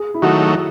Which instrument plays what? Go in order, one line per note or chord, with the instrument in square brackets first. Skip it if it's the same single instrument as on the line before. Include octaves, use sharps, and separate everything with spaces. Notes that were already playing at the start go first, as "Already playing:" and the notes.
Already playing: [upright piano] G#4
E4
[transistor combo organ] D#3 F#3 A3 [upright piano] F#4